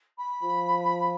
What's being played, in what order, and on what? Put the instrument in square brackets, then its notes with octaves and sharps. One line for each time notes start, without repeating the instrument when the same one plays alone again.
[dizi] B5
[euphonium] F3